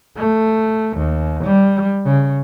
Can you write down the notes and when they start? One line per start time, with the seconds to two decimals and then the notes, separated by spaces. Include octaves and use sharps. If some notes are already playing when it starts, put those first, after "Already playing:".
0.16 A3
0.97 D#2
1.45 G3
2.05 C#3